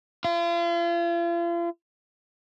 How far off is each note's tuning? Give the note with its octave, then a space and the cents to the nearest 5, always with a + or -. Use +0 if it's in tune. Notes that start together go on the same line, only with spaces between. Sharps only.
F4 -40